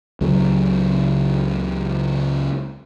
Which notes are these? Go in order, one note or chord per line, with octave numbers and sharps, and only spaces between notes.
C#2 C#3 F#3